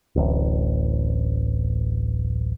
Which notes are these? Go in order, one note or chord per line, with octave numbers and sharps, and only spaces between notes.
D1 A1